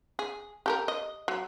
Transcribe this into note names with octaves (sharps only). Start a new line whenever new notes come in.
G#4
G4 A4 A#4
D#5
F#3